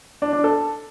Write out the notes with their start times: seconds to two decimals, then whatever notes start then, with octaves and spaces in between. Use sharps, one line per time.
0.22 D4
0.33 D4
0.44 A4